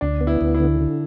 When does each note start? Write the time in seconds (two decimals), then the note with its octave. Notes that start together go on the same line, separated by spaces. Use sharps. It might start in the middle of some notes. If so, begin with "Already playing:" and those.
0.01 D2 D4
0.21 B3
0.27 E4
0.41 D2
0.54 E4
0.60 D3
0.81 D3